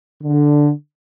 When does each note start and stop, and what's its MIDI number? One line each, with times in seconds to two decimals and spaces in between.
0.23 0.71 50